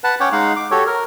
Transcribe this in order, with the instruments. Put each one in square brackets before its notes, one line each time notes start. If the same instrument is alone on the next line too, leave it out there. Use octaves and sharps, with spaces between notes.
[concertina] B4 F#5 A5
C#4 C#5 F#5 G5 D6
G#3 D#4 F5 F#5
D6
F#4 G4 A4 C#5
A#4